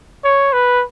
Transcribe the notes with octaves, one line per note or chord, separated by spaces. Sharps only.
C#5
B4